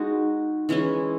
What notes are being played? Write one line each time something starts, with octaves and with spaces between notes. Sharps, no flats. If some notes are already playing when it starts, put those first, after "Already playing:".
Already playing: G#3 D#4 F#4
E3 G#3 C#4 E4